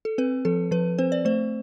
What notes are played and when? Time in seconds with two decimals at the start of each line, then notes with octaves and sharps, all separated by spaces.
0.05 A4
0.18 C4 B4
0.45 F3 A4
0.71 F3 B4
0.98 C4 C5
1.12 D5
1.25 A3 C5